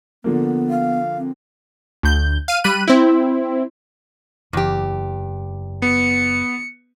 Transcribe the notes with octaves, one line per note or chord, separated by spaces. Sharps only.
D3 F3 A#3 B3
F5
C4
D2 G6
F5 D#7
G3 B5 F#6 D#7
C4 E4
F#1 E2 G4
B3 C#7